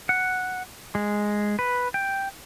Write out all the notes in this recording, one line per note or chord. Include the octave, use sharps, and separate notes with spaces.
F#5
G#3
B4
G5